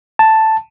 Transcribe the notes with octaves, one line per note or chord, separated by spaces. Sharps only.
A5